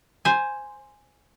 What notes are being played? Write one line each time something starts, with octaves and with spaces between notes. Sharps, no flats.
C5 G#5